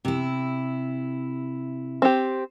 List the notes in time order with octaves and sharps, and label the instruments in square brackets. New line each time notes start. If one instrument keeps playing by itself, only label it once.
[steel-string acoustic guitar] C3 E4
[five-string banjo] C4 G4